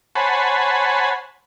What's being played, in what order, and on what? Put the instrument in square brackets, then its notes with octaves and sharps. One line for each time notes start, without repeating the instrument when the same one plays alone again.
[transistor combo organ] C5 C#5 F#5 G#5 A5 B5